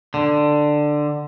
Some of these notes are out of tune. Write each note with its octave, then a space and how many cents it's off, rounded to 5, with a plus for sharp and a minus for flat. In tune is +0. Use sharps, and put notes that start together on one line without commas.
D3 +15